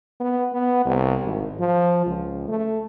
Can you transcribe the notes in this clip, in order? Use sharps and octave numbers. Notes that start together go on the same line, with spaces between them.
B3
B3
C2
G#1
F3
C#2
A3